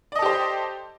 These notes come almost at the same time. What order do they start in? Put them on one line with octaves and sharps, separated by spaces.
D5 D#5 A4 G4 C5